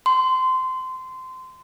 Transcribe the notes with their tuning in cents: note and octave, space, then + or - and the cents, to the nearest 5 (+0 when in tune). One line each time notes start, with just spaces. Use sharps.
C6 -20